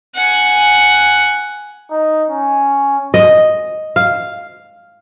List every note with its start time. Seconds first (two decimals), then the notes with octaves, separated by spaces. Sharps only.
0.15 F#5 G#5
1.91 D#4
2.30 C#4
3.14 D#5
3.96 F5